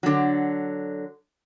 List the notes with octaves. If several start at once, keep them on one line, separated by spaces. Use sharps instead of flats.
D3 F#3